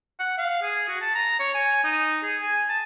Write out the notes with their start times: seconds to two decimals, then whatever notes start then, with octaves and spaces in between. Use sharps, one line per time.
0.19 F#5
0.38 F5
0.63 G#4
0.88 F#4
1.02 A5
1.14 A#5
1.39 C#5
1.54 G#5
1.84 D#4
2.23 G#4
2.42 G#5
2.69 A5